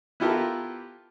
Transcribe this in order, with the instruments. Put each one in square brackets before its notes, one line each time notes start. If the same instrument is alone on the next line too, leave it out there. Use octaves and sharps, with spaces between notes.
[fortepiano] B3 E4 F4 G4 A4 A#4